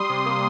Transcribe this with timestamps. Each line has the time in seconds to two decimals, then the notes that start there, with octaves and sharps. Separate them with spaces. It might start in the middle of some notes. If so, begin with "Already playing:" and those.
Already playing: G3 C6 D#6
0.09 C3
0.26 A#3